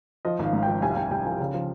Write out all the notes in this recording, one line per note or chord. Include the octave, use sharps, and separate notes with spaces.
F3 D#5
G#1 F5
G#2 F5
F3 G5
C2 G#5
F5
C2 G5
C2 G5
F3 G#5
C#3 F5
F3